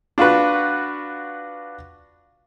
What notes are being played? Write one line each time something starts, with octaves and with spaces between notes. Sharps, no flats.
D4 F4 F#4 B4